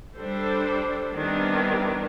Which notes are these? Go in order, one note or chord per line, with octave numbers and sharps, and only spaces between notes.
G3 D4 A4 C5
D#3 E3 G3 B3 C4 D4